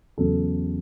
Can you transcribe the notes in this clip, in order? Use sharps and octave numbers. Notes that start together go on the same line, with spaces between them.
E2 C#3 F#3 A4